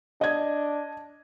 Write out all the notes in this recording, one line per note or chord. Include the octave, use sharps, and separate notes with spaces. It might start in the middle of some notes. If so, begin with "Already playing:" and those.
D4 D#5 G#6